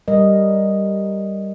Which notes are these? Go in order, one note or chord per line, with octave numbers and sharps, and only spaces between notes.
G3 A#4 D#5